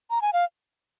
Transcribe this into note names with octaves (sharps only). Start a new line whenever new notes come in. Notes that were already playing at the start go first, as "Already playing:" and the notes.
A#5
G#5
F5